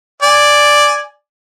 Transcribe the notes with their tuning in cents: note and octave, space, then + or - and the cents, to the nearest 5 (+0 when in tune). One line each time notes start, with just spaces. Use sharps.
D5 +0 G#5 +0